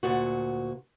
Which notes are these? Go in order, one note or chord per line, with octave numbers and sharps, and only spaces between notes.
D2 A#2 F#4